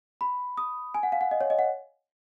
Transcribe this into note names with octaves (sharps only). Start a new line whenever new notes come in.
B5
D#6
G#5
F#5
F5
F#5
D#5
C#5
D#5
F#5